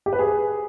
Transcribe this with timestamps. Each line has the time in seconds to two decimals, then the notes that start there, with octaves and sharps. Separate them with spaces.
0.06 G4
0.13 B4
0.19 G#4